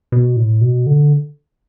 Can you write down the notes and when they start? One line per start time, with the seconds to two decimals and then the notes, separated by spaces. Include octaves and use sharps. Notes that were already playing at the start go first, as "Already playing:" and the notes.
0.12 B2
0.37 A2
0.61 B2
0.87 D3